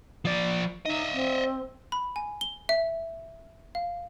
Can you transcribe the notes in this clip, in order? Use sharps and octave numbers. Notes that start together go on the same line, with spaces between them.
F3 D5
D#4 D#5 E5
C4
B5
G#5
G7
E5
F5